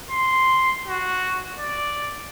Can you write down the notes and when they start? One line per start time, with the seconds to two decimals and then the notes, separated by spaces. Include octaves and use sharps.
0.11 C6
0.87 F#4
1.59 D5